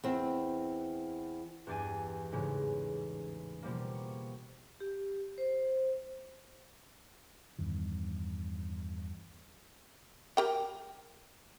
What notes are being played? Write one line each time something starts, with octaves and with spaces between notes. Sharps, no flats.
E2 C4
E2 G2 G4 G#5 A6 D#7
A1 G#2 C#3 G#3
B2 F3 G3 A#3
C#6
G4
C5
E2 G2 D#3
G4 A#4 G5